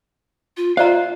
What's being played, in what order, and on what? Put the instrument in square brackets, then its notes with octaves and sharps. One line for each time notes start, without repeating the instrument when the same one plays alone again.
[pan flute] F4
[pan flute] F4 [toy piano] C5 D5 A#5 [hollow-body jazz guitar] E5 F5